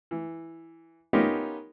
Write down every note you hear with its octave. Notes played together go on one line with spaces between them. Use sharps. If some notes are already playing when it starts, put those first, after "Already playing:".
E3
B3 C#4 D#4 F4 G4 A#4